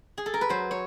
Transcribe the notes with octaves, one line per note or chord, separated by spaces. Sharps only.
G#4
A4
A#4
B4
F#3 C5
C#5